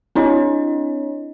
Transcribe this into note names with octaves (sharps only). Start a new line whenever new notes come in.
C4 D4 E4 C#5 D#5